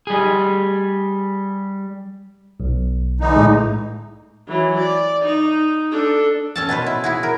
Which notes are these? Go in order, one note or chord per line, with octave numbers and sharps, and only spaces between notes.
G3 G#4
B1
D3 E3 D#4
A2 G#3
E3 F#3
D5
D#4
D4 A4
C#4 A4 A5
B2 C#4 B4 C5
E4
E4 F#4 G#4
A#4